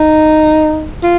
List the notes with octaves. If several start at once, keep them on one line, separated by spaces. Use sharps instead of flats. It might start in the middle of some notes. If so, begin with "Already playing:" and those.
Already playing: D#4
F4